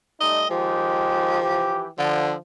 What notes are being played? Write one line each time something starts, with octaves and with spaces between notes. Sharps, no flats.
G3 A3 D#4 D#5
D#3 F3 G#3 G4
E3 G4
D3 F3